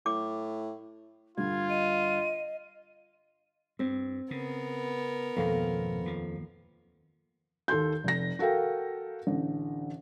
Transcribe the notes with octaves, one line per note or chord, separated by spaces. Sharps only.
A2 D6
G2 D3 G3 F4 G#6
D#5 D#7
G2 C4
C#3 B3 A#4
G#1 F2 B2 A#3
D#2 F3
D#2 A4 C6 G6
F1 A#6
F#4 A4 A#4 F5 G5
A1 D3